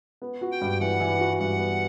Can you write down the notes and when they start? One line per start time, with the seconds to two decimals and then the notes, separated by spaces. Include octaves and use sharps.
0.22 B3
0.41 F#4
0.51 G5
0.61 G2
0.80 E3 F#5
1.00 E3
1.20 F#4
1.40 G2 F#5
1.59 B3